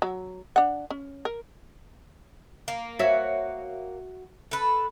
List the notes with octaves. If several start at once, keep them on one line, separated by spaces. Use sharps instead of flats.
F#3
D4 F#5
C#4
A#4
A#3
F#4 C#5 E5
A4 B4